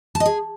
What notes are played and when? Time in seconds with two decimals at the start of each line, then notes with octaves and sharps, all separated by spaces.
0.15 A5
0.20 D#5
0.26 G#4